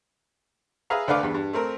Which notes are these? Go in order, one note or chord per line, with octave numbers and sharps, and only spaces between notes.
G#4 B4 E5 F5 A#5
D2 A3 D4 B4 F5 D6
E2 G2
G2
A3 C4 A#4